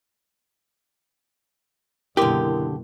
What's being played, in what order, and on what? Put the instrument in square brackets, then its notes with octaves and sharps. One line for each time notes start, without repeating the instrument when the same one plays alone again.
[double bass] F#1 B2 [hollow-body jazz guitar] D3 G4 [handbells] E4 A#4 C6